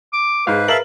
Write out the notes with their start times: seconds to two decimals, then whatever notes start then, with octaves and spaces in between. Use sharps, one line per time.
0.13 D6
0.47 G#2 B4 C5 F5
0.68 A#4 B4 E5 F5 A5 F#7